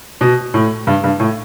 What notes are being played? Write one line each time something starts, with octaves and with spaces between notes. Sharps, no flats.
B2
A2
G2
G2
A2